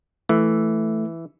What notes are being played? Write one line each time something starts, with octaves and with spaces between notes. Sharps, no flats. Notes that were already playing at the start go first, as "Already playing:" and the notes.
E3 A3